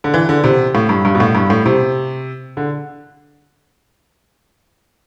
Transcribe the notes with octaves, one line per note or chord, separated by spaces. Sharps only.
D3
E3
D3
C3
A2
G2
G2
B2
A2
G2
A2
C3
D3